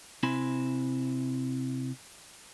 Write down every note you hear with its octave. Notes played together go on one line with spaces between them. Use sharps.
C3 C4 E4 G#5 B5 C6